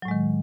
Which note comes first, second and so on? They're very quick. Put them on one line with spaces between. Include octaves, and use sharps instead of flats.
F#3 A2 G#3 D#3